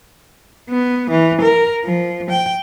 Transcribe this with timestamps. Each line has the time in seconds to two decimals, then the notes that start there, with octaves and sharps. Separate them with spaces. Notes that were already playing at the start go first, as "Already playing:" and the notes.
0.70 B3
1.11 E3
1.41 A#4
1.85 F3
2.31 G5